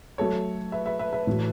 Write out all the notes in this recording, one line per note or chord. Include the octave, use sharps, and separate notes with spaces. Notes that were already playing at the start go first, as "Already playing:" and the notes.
F#3 A3 F#4 A4 C#5
B4 E5
B4 E5
B4 E5
B4 E5
A2 E3 A3 F#4